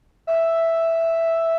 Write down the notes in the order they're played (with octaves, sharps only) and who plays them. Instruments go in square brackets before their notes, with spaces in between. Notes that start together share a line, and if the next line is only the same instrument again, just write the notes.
[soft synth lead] E5